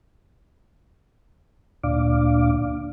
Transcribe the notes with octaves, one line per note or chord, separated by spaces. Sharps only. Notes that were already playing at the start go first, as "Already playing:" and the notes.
D2 A#2 D4 F5 D6